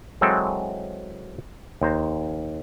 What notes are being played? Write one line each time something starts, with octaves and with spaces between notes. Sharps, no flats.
E3 F#3 G#3 C4 A4
D#2 C5 A#5